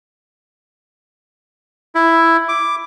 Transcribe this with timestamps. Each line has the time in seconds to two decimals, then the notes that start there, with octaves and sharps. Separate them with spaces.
1.95 E4
2.48 D6